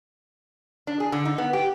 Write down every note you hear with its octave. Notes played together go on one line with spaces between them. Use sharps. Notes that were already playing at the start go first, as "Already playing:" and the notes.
D4
G#4
D3
D#4
B3
G4